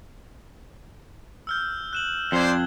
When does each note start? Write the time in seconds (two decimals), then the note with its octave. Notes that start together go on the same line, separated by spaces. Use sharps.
1.47 E6 F6 G6
1.93 F#6 E7 F#7
2.32 F2 C5 D5 G#6 G7